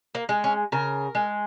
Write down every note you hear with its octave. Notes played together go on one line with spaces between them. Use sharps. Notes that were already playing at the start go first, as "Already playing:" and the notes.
A#3
G#3
C#4
C#3 A#4
G#3